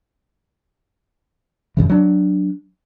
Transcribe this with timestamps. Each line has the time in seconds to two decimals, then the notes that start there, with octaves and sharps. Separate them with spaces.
1.77 F#2 A2 C#3 E3
1.89 F#3 D4